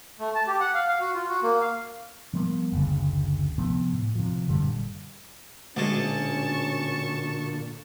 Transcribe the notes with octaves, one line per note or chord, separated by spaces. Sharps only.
A3
A5
G4
F#5
F5
F5
F#4
F4
F#4
A#3
F5
F3 G3 A#3 B3
F#1 D2 C#3
C3 F3 A3 B3
A2
C3 F3
F#1 A#2 D3 G3
D2 A#2 D3 G#3 C#4 A5 C#6